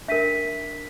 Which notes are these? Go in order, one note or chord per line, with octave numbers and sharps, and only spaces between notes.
D4 A#4 E5 B6 D#7